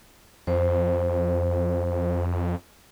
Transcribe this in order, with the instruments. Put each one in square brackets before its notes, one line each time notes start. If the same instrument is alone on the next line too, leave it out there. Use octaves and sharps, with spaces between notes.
[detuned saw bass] F2 [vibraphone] C5